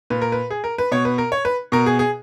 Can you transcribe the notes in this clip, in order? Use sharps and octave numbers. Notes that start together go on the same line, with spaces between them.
A#2 B4
A#4
B4
G#4
A#4
B4
B2 C#5
B4
A#4
C#5
B4
B2 A#4
G#4
G#4